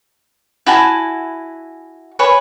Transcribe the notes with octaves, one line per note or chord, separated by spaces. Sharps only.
E4 F#4 G#5 A5
B4 C#5 G#5